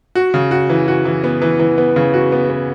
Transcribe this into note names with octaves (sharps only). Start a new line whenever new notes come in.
F#4
C#3
F#4
E3
F#4
E3
B3
E3
E3
B3
C#3
F#4
B3
B3